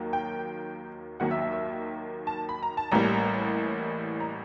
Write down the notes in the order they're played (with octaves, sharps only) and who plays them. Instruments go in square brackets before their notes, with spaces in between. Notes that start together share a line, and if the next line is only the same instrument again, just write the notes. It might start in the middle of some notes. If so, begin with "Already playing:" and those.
Already playing: [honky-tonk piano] D#2 D#3 F#3 A#3
G5
D#2 D#3 F#3 A#3 F#5
E5
E5
E5
A5
B5
A#5
A5
A1 A2 E3 G3 A#3 A#5
A#5